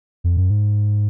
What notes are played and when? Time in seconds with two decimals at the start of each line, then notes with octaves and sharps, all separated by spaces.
0.24 F2
0.37 F#2
0.50 G#2